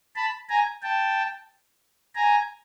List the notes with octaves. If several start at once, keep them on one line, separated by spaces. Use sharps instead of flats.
A5 B5
G#5 A#5
G5 A5
G#5 A#5